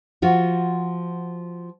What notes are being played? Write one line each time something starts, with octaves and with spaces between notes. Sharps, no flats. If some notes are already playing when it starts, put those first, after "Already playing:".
F3 F4 F#4